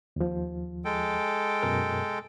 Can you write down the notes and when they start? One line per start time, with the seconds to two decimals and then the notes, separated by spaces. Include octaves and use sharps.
0.16 D#2 F3
0.85 G#3 A4 G5
1.62 F#2 B2 A#4